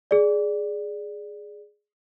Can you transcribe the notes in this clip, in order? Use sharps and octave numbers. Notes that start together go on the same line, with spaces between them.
G#4 D5